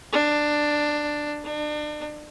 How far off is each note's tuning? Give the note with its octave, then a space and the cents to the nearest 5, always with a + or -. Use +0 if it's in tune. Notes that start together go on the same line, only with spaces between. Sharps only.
D4 +10
D4 +35